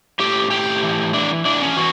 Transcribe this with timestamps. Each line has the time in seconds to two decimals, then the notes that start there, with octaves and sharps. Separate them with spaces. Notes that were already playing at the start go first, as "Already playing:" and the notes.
0.20 A2 G4
0.51 A2 G4
0.83 E3
1.14 E3 D4
1.45 E3 D4
1.62 C#4
1.77 E3 F#4